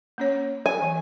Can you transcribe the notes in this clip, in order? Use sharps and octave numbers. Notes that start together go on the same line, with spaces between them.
A#3 C#4 C#5
G#5
E3